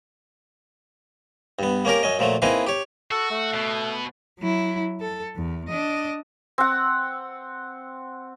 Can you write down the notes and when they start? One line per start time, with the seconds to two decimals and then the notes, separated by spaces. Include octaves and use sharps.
1.59 G2 B3
1.85 A#3 C#4 G4 A#4
2.03 F#2 C#4 D#5
2.19 A#2 F3 F#3 A3
2.42 A#3 C4 D#4 E4 G#4 B4
2.67 G4 C#5
3.11 F#4 A4
3.31 A3
3.55 B2
4.40 F#3 E4
5.01 A4
5.36 E2
5.69 D4 D#5
6.58 C4 F#5